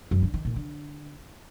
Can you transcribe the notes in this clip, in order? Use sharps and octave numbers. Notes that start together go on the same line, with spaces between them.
F#2
D3
D#3
A#2
D3